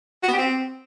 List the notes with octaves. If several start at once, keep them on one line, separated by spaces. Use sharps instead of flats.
F#4
B3
G4
C4